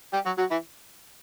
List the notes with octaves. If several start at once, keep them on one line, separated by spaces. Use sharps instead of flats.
G3 G4
F#3 F#4
F#3 F#4
E3 E4